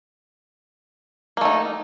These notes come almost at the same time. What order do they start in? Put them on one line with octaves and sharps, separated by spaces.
A#3 A3 D#4